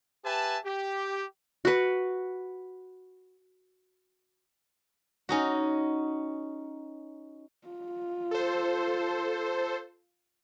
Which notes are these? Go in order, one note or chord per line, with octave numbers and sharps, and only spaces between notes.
G4 B4 E5 G#5 A5
G4
F#4 B4
C#4 D#4 F#4
F4
A4 C5